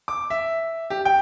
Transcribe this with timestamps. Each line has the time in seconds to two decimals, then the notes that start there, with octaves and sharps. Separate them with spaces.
0.08 D6
0.30 E5
0.90 G4
1.05 G5